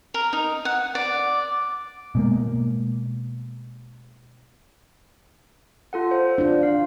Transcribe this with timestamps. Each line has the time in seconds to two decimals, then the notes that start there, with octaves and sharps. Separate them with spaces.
0.14 A#4
0.33 D#4
0.65 F#5
0.95 D5
2.15 B2 G#3 A#3
5.93 F4 A4 F#5
6.11 C5
6.38 D4 F4
6.63 F5